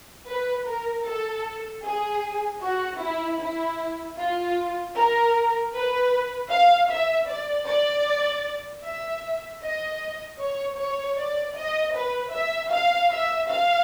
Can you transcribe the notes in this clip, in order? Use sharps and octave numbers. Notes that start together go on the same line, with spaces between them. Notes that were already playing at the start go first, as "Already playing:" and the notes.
B4
A#4
A4
G#4
F#4
E4
E4
F4
A#4
B4
F5
E5
D5
D5
E5
D#5
C#5
C#5
D5
D#5
B4
E5
F5
E5
F5